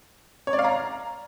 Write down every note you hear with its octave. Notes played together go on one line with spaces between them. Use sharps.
C#5
D5
F5
A#5